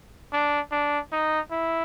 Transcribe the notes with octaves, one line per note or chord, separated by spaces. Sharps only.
D4
D4
D#4
E4